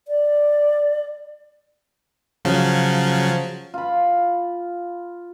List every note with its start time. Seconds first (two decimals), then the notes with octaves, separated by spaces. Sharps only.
0.08 D5
2.45 C#3 F3 F#3
3.74 F4 B5